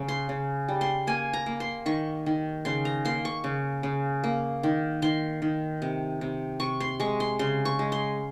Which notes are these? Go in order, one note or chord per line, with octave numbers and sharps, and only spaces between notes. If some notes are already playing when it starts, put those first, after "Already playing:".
Already playing: C#3
C6
C#3
G3
C6
A#3 G#5
A#5
A#3
C6
D#3 C#6
D#3
C#3 C6
A#5
A#3 C6
C#6
C#3
C#3
A#3
D#3
D#3 C6
D#3
C3
C3
C3 C#6
C6
G#3 C#6
C6
C#3 C6
C#6
G#3
C6